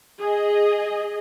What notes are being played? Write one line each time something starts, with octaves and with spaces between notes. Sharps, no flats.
G#4 D#5